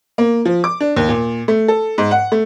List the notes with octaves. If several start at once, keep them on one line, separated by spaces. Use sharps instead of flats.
A#3
F3
D6
D4
D#2
A#2
A3
A4
G#2
F#5
A3